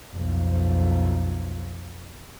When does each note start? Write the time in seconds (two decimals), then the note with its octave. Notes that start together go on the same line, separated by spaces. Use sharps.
0.15 B1 F2